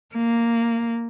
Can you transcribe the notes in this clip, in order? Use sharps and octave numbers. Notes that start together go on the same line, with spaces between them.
A#3